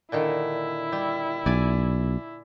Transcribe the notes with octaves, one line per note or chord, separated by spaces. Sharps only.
A#2 D3 D#3 E4
G3
B1 D5 G#5